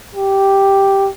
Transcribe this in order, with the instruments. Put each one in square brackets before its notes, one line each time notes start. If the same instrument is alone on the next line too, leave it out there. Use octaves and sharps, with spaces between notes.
[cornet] G4